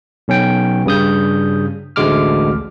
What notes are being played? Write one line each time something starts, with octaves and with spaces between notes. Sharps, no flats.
B1 C#4 G5
G2 C#3 D#6 G6
A1 D2 D3 G#3 D6 F6